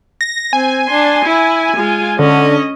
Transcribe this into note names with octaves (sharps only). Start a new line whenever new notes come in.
A#6
C4 G#5
D4 C6
E4
G#3 F4
D3 C#4 D#5